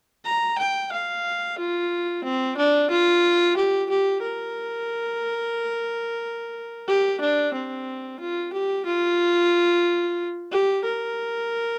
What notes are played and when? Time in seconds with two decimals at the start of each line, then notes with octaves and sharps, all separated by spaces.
0.25 A#5
0.58 G5
0.92 F5
1.59 F4
2.24 C4
2.57 D4
2.90 F4
3.57 G4
3.90 G4
4.22 A#4
6.88 G4
7.21 D4
7.54 C4
8.20 F4
8.53 G4
8.86 F4
10.52 G4
10.84 A#4